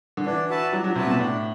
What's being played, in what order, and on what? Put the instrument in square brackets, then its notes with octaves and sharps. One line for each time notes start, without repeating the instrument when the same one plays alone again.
[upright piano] D3
[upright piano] E3 [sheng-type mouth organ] D4
[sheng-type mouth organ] F#4 B4 E5 A5
[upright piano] F#3 [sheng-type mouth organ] D4
[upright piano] F#3
[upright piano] C3 [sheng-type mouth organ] F#4 B4 E5 A5
[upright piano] B2
[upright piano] A2 [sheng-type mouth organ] D4